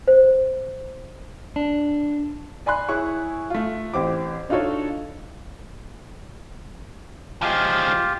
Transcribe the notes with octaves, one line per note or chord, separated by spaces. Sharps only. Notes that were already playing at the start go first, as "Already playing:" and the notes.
C5
D4
D5 G#5 B5 C6 F#6
E4 G#4 C#5 C#6
A3 F4
A1 C4 G4 D6
D4 D#4 F4 F#4 A4 C#5
F3 G#3 F4 G4